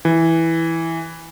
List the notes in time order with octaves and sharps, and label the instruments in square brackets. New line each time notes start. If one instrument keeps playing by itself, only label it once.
[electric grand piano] E3